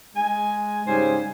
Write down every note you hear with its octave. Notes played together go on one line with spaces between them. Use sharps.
G#3 G#5
G#2 C#3 G3 C5 G#5